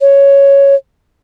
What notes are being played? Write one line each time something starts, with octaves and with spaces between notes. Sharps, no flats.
C#5